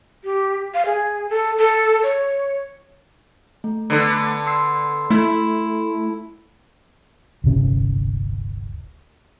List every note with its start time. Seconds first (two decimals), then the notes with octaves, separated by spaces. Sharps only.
0.24 G4
0.74 F5
0.86 G#4
1.30 A4
1.58 A4
2.03 C#5
3.64 A3
3.90 D3 B3
4.47 C6 E6 C7
5.10 A3 E4
7.44 D1 G1 C3 C#4